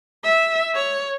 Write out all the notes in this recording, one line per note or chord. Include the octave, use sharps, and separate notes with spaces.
E5
C#5